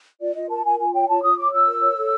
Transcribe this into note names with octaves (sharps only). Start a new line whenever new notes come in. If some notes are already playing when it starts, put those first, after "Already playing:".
F4 D5
F4 D#5
A#4 A5
F4 G#5
F4 G#5
C#5 G5
F4 A5
F4 D#6
C#5 D6
F4 E6
A#4
C#5
A4